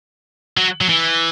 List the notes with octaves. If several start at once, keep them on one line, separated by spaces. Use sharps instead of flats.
F#3
F#3
E3